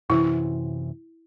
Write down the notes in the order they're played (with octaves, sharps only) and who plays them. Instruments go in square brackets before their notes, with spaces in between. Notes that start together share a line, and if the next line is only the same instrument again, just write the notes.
[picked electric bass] F#2 C3 E3 [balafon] E4